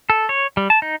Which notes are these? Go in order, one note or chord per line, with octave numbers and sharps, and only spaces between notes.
A4
C#5
G3
A5
D#4